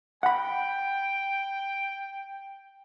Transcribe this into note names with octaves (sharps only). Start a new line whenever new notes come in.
F#5 G5 B5